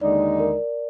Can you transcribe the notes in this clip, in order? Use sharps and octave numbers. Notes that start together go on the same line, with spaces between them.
D#2 D3 G#3 D#4 D5
A#4